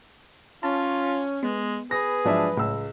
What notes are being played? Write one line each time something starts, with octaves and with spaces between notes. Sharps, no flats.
C#4 F4 A5
G#3 B3
G#4 B4 A#6
G#2 F3 F#3 D4 E5
C#2 A2 E6